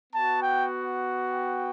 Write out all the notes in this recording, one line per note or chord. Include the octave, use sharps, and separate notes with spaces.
B3 F#4 A5
G5
G5